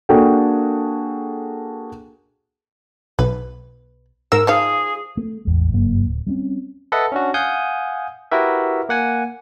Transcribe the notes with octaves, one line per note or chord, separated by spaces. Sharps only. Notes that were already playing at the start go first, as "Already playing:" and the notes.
A#3 D4 F#4 G#4 A4 G5
B1 B4
G#2 G#3 A#4 E6
F3 D#4 G#4 F5
A3
A1 E2 G#3
F#1 G2 F#3 A#3
D1
G3 C4 C#4
A4 B4 D#5 E5 F#5
C#4 D4 F#4
F5 F#5 G#5 D#6 G6
E4 F#4 G4 A#4 B4 E5
A#3 F#5 G#5